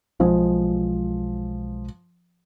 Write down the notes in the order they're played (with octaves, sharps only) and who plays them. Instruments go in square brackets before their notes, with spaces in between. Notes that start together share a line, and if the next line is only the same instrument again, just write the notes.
[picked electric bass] B1 G#3 [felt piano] F3